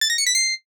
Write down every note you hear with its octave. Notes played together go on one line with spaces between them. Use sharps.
A6
A#6
C#7
B6
C7